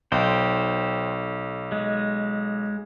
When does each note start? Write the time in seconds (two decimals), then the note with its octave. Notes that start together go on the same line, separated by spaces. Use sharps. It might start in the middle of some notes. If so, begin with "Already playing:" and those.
0.12 B1 C5 G5
1.72 G#3